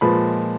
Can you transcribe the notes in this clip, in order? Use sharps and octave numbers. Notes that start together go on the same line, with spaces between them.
A#2 F3 G#3 B4 B5